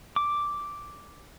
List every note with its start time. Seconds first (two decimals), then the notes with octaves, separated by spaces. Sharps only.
0.16 D6